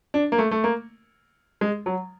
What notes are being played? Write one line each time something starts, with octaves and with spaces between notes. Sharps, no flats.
D4
A#3
A3
A3
A#3
G#3
F#3